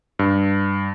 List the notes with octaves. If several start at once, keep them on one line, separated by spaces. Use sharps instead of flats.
G2